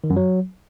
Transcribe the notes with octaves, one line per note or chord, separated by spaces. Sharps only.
D#3
F#2
F#3